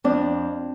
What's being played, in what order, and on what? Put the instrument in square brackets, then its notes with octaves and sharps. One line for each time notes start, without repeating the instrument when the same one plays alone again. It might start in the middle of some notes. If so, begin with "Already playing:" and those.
[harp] F2 D4